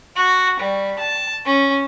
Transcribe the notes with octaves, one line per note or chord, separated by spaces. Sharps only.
F#4
G3
A5
C#4